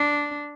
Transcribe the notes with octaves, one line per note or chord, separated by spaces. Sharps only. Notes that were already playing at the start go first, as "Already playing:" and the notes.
Already playing: D4